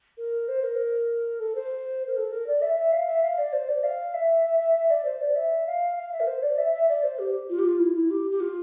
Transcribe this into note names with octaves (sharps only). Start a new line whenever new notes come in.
A#4
C5
A#4
A4
C5
A#4
A4
A#4
D5
E5
E5
F5
E5
F5
D5
C5
D5
F5
E5
E5
E5
E5
D5
C5
D5
E5
F5
F5
E5
A#4
C5
D5
E5
E5
D5
C5
G4
F4
G4
F4
E4
E4
G4
G4
F4